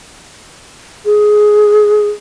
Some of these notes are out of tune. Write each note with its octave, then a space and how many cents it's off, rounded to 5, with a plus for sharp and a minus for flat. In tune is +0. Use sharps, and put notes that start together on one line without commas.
G#4 +15